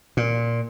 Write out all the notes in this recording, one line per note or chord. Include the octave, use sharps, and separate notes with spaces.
A#2